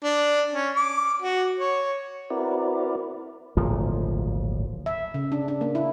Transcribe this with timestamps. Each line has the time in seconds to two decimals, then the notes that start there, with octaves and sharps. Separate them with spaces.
0.04 D4
0.53 C#4
0.76 D6
1.22 F#4
1.59 C#5
2.30 C4 E4 F#4 A#4 B4 D5
3.57 D1 G#1 A#2 F3
4.86 E5
5.14 C#3
5.32 D4
5.48 D4
5.61 A#3
5.75 E4